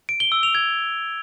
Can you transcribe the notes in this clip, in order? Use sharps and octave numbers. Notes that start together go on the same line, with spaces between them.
D7
G7
E6
F7
G#6